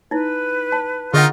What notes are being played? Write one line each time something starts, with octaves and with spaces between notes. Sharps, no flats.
D#4 E4 B4
A5
D3 D#4 F4 G#4 A#4 D#5 F#5